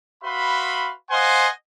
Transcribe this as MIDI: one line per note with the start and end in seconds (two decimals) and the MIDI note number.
0.23 0.91 66
0.23 0.91 71
0.23 0.91 76
0.23 0.91 77
0.23 0.91 83
0.23 0.91 84
1.11 1.47 72
1.11 1.47 75
1.11 1.47 77
1.11 1.47 78
1.11 1.47 80
1.11 1.47 84